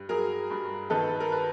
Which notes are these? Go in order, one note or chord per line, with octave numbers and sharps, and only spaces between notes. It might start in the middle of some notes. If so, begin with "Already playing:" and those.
Already playing: G2
F#3 G#4 A#4
G2
D#3 A4 B4
A#4
B4